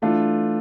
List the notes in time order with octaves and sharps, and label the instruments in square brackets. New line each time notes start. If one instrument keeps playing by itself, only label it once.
[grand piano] E3 A3 D4 F4